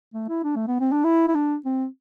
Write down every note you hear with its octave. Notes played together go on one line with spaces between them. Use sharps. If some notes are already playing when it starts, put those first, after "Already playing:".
A3
E4
D4
A3
B3
C4
D4
E4
E4
D4
C4